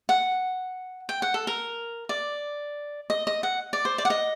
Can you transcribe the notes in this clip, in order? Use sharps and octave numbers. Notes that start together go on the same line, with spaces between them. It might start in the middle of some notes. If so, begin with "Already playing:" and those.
F#5
G5
F#5
A4
A#4
D5
D#5
D#5
F#5
D5
C5
D5
F#5
D#5